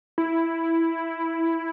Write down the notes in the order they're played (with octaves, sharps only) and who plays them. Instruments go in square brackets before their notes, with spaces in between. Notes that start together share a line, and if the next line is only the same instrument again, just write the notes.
[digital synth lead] E4